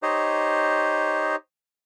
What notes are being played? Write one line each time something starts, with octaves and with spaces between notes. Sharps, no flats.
D#4 G4 C5 C#5 D#5